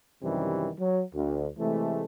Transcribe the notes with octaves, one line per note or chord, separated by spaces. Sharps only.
F#2 C3 D#3 E3 G3
F#3
D2
C3 E3 G#3 A3